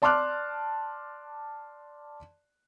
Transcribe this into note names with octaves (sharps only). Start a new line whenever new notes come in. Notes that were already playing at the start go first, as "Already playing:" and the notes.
D5 A5 C6 D6 F6 F#6